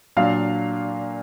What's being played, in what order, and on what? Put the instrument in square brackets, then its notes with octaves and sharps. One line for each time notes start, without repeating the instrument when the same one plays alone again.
[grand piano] A#2 F#3 D4 F5